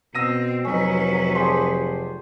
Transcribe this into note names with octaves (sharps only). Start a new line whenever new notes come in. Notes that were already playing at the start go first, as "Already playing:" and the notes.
B2 C4 E6 A#6 D#7
F1 F#3 C#4 D#4 B4
D4 G#4 C5 G5 C6